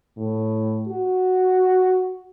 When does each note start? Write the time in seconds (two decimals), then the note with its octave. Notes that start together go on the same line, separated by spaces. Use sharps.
0.17 A2
0.88 F#4